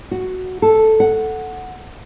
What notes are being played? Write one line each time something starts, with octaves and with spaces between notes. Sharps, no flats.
F#4
A4
F#5